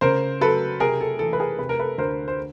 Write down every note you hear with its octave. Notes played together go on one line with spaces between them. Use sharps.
C#3 A#4 C5
F#3 A4 B4
C3 G#4 A#4
A4
E3 A4
B4
G#4 A#4
C3 B4
A#4
A4 B4
D2 A#4 C5
C5